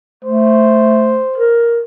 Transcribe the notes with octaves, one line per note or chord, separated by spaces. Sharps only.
A3 C5
A#4